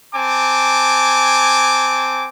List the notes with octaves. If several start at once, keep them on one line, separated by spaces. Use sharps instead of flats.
C4 G#5 A5 D6